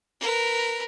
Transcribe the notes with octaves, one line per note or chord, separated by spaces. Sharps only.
A#4 B4